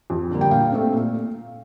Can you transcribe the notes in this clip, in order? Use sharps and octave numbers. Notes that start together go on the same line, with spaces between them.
F2
D3 G3 A#3
G5
A#2 F5
A3 C4
A#2